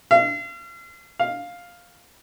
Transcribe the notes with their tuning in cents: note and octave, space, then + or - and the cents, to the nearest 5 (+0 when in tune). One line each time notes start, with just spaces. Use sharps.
F5 -40
F5 +5